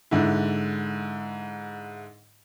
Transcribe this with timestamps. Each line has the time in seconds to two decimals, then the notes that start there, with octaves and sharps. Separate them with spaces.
0.11 G#2 D3 E4